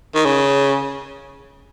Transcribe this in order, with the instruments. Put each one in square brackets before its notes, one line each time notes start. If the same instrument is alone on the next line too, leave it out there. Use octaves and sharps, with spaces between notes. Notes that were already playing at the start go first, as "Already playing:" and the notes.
[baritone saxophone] D#3
C#3